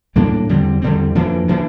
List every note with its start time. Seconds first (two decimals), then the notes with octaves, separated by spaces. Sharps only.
0.16 A2 G3 A#3 D4
0.49 E2 D3 G3 C4
0.82 E2 D3 G3 C4
1.15 F2 E3 A#3 D4
1.48 E3 A#3 D4